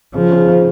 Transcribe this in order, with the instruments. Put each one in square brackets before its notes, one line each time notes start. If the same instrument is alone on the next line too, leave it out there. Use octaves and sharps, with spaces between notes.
[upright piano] C#3 [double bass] F3
[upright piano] C#3
C#3